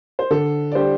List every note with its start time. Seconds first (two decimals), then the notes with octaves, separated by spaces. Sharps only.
0.19 C5
0.30 D3 A4
0.72 D5
0.75 G3 D4 G4 C5